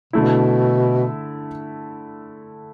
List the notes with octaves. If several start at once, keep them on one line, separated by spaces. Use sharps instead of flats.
B2 D3 A3 E4